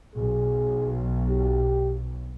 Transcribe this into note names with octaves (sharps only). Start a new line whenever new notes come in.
B1 G#4
G4